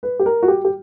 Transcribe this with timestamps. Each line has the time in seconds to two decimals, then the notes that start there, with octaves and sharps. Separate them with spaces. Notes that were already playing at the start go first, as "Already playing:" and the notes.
0.03 B4
0.19 G4
0.26 A#4
0.43 F#4
0.48 G4
0.65 G4